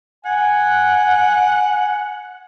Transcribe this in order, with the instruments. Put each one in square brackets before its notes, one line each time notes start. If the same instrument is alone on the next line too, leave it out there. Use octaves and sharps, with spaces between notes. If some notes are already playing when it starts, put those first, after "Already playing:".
[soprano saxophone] F#5 [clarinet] G#5